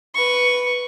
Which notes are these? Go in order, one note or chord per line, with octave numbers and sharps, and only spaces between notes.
B4 C#6